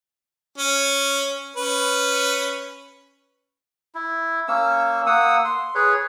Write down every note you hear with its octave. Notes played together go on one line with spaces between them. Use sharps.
C#4
C#4 B4
E4
A#3 C#4 E6
A#3 F#5 D#6 E6
C6
G#4 B4 C#5